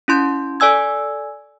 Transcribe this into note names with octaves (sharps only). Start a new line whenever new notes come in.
C#4 E4 C6 G6
A4 D5 G#5 E6 G#6